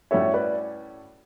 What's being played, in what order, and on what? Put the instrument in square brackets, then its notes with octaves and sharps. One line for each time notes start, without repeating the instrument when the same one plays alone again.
[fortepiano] A2 G3 C#4 F#4 A4 [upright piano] C#5 E5
[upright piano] B4 D5